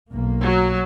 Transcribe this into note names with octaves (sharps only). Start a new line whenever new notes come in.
B1 A#3
F#3